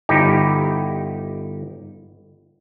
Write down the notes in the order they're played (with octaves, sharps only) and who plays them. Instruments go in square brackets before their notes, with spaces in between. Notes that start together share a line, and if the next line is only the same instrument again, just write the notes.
[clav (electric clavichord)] G1 D#4 E4 G4